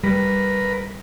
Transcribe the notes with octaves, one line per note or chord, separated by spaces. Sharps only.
G3 A#4 B4